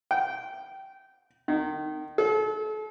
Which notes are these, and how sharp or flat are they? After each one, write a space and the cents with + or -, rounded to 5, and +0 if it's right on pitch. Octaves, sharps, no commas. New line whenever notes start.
G5 -20
D#3 -25
A4 -40